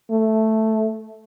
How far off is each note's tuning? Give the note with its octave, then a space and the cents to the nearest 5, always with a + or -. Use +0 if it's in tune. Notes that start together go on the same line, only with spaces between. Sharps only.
A3 +0